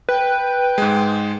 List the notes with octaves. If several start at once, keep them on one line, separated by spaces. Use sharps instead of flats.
B4 G5
G#2 G#3